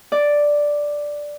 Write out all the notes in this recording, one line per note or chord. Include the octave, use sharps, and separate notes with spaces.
D5